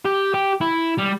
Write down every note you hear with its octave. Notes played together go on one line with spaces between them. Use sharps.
G4
G4
E4
G3